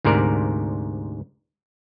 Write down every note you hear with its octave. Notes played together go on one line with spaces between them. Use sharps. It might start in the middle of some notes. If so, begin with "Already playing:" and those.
D2 G#2 C3 A#4 D5